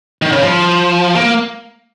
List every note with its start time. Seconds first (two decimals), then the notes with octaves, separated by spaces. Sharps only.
0.22 D#3
0.32 C#3
0.42 F3
1.16 A#3